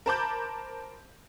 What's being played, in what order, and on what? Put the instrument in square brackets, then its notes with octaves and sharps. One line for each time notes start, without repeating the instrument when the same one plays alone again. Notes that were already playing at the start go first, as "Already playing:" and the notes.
[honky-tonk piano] A#4 C5 A5 B5 D6 G6